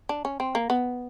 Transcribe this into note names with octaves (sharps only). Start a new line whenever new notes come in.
D4
C#4
C4
A#3
B3